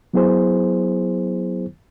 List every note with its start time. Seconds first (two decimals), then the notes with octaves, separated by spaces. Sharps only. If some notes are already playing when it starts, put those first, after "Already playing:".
0.14 F#3 B3 E4 G#4 C5